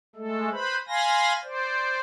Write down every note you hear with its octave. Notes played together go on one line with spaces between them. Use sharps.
G#3 A3 A4
B4 C5 B5
F5 G#5 B5 C6 A#6
C5 D5